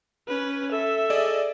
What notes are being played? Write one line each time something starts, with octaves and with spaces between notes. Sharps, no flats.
C#4 B4
A4 E5
G#4 D5 D#5